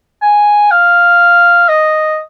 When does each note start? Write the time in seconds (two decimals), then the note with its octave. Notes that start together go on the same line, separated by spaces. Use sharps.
0.22 G#5
0.71 F5
1.69 D#5